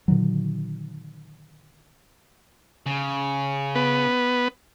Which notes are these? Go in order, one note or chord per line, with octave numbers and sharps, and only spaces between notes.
A#2 D3 D#3 F#3
C#3
B3 B4